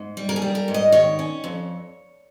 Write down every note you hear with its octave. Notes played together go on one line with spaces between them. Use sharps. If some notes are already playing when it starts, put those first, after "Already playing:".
Already playing: G#2
G3
A#4
G#4
G3
A#4
G#2
D#5
D#3 C#5
C#4
F2